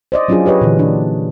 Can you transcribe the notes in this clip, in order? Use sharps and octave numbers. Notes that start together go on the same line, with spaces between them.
C5 D5 D#5
F#3 C#4 D4 F4 G#4
G4 B4 C#5 D#5
A#2 D3 E3
D4